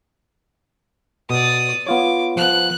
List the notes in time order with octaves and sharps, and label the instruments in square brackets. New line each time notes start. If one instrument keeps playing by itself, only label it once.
[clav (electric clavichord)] B2 [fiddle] D5 D#6
[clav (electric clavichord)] B3 F4 C#5 [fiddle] D6
[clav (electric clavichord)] F3 B3 [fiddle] F#6